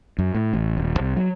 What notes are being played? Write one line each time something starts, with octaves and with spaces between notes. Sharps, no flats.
F#2
A2
A1
D#1
C2
F#3